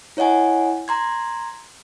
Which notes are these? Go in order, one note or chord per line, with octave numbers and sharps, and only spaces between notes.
E4 C#5 D#5 F#5 G#5
A#5 C6 G#6